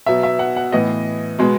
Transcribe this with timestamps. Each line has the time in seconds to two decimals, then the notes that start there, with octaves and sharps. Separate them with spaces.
0.06 B2 F#3 B3 E5
0.23 E5
0.39 F#5
0.56 F#5
0.72 A2 E3 B3 D#5
1.39 B2 G#3 B3